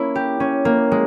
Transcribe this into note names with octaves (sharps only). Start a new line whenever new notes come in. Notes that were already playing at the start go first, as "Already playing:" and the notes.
Already playing: A#3 C#4 E4
G4
C#4
A#3
G#3